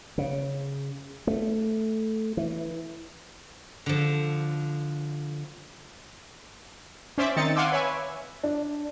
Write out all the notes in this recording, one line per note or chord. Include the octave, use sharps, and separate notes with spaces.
C#3
A3
E3
D3 F3
C#4 C5 D5 E5
D#3 C4 D#4 A6 C#7
F5 F#5 G#5 C6 D6 E6
B4 C#5 E5 G#5
D4